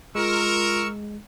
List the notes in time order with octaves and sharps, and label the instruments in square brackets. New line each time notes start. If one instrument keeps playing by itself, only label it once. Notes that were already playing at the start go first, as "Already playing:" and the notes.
[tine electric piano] G#3 [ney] F4 [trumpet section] A#4 [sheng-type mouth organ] C#6 E6